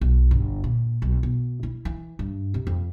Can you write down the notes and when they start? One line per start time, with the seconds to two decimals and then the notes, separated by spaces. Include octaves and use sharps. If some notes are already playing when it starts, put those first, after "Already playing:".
0.01 B1
0.31 G1
0.64 A#2
1.02 B1
1.23 B2
1.63 E4
1.85 E3
2.19 G2
2.54 C3
2.67 F2